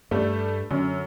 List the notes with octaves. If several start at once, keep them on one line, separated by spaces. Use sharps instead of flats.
G2 G3 A3
F#2 D3